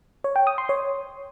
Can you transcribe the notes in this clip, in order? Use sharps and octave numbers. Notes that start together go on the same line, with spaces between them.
C#5
G5
D#6
C6
C#5